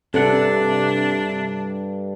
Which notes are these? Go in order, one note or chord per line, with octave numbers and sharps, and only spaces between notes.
G2 C3 D4 A4 F#5